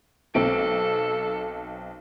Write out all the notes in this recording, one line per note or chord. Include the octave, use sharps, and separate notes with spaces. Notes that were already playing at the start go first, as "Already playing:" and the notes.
B1 C4 A4 D7